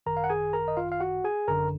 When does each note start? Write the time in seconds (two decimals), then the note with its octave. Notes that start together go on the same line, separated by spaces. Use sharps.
0.06 G#1 F#2 D#3 A#4 A#5
0.17 F5
0.24 F#5
0.30 G#4 G#5
0.53 A#4 A#5
0.68 D#5
0.77 F4 F5
0.92 F5
1.00 F#4 F#5
1.24 G#4 G#5
1.48 G#1 F#2 D3 A#4 A#5